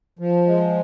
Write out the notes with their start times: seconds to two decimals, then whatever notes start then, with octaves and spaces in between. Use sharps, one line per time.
0.19 F3
0.47 G#3